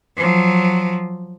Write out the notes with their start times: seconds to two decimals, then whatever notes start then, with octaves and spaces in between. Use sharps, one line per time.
0.17 F3 F#3